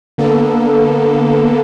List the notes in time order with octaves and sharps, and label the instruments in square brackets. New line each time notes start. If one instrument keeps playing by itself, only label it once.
[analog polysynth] D3 A#3 B3 A4